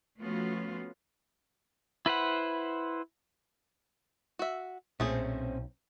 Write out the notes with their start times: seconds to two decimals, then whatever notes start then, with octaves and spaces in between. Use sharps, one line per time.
0.21 F3 A3 B3 C#4 F4 F#4
2.06 E4 B4 C5 F#5
4.39 F#4 E5
5.00 B1 A#2 A3 C4 C#4 G#4 C5